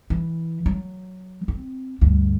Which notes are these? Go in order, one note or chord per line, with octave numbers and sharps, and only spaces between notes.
E3
F#3
C4
D2 G2